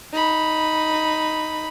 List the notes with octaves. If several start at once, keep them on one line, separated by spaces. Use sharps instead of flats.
D#4 B5